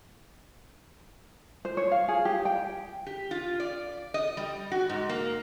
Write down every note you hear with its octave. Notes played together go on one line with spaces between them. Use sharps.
C5
C#5
F5
G#4
G4
G5
G4
F4
D5
D#5
G3
F#4
G#2
A#3